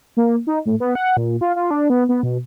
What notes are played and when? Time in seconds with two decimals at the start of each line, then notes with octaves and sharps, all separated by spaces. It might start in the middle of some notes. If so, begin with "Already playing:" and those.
0.17 A#3
0.47 D#4
0.66 A2
0.80 B3
0.95 F#5
1.17 A#2
1.41 F4
1.56 F4
1.71 D4
1.90 B3
2.09 B3
2.23 B2